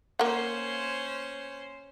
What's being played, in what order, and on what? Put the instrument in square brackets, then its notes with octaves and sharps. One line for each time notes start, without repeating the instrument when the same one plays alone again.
[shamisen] A#3 F#5 [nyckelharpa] C#4 C5